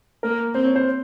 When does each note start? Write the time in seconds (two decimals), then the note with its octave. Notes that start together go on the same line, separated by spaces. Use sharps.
0.23 A#3 A#4
0.54 C4 C5
0.65 C#5
0.76 C5